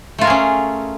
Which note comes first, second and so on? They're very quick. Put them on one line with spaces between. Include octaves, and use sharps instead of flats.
A3 F4 A#4 G#4 C#4